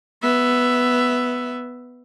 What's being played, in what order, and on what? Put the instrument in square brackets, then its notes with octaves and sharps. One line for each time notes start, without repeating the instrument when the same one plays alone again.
[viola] B3 E5